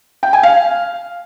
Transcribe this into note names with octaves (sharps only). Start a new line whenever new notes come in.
G5
G#5
F5